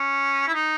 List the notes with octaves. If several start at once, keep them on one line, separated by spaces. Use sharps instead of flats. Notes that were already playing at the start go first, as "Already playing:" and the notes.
Already playing: C#4
E4
D#4